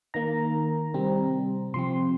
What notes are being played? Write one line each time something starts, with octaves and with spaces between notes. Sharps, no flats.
D#3 A#3 A#5
C3 G3 C4
C3 F3 C4 C6